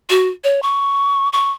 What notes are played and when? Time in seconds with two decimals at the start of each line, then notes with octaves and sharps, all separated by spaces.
0.10 F#4
0.44 C#5
0.63 C#6
1.33 C#6